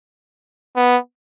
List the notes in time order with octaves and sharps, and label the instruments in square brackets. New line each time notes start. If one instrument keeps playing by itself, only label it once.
[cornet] B3